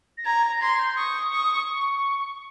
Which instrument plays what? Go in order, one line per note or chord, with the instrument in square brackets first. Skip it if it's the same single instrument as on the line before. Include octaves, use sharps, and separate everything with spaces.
[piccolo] A#6
[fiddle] A#5 [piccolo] G#6
[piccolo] A#6
[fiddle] C6 [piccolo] G#6
[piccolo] G6
[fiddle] C#6 [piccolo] D#6
[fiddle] C#6
[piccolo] C#6